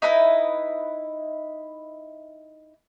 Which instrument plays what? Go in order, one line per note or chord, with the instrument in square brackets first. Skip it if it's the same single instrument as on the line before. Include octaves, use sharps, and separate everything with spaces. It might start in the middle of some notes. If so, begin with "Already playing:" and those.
[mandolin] D#4 E4 B4 D#5